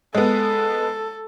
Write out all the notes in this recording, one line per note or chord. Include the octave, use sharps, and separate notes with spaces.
G#3 B3 A4